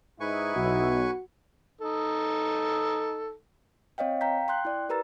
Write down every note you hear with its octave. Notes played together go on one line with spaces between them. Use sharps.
G#2 D#4 E4 B4 G#5 C#6
B1 F#4
D#4 A4
C4 C#5 D#5 F5 G5
F5 G5 A#5 G6 B6
G5 C6 F#6 G6
E4 D5
G4 A#4 B4 A#5 E6 A6